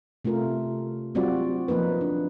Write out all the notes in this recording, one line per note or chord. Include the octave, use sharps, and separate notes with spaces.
C3 A3 C#4 F4 A#4
F#3 G3 C4 F4 F#4 D5
F3 A#3 D#4 B4
D4